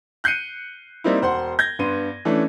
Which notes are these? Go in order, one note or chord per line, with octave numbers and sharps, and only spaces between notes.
F#6 G6 C7 C#7 D#7
G3 A#3 C4 D#4 E4
E1 C5 F#5 C6
G6 G#6 A#6
G2 B3 C6 D#7
E3 A3 C#4 D4